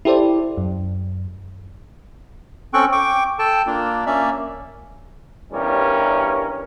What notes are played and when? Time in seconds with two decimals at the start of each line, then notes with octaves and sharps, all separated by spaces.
0.05 E4 G4 A4 C5 D5
0.58 F#2
2.74 C4 C#4 A4 G5 C#6 F#6
2.92 G5 C#6 D6
3.39 A4 G5 A5
3.66 A#3 D4 F4
4.06 A#3 C#4 D5 E5
5.53 E2 G2 G3 C#4 A#4